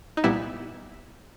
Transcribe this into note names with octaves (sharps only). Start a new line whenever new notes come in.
D#4
C2 A#2 G3 B3 E4